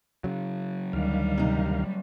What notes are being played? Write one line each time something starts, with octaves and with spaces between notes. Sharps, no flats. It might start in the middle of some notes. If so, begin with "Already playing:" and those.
C#3 F#3
D2 D#3 G3 F5
C3 D#4